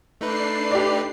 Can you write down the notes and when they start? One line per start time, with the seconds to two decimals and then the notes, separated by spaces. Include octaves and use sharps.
0.21 A3 D4 D#4 B4 C7
0.71 G4 D5